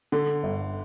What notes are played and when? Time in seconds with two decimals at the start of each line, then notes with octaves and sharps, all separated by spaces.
0.12 D3
0.43 G1